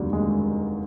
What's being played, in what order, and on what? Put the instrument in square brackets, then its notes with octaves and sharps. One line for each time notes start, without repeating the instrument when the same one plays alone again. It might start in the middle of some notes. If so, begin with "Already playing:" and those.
Already playing: [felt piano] F1 D#2 D3 [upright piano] F#3 G3
[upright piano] G#3